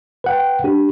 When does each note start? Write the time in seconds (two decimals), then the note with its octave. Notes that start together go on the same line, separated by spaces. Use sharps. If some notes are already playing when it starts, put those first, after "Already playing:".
0.24 B4 F#5 G5
0.64 D4 G4